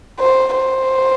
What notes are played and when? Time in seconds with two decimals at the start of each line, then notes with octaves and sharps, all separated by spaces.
0.20 C5
0.56 C5